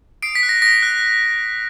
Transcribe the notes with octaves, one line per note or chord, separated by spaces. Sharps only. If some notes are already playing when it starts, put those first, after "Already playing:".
D#6 C7 D7
B6
F#6
A#6
D#6 A#6
F#6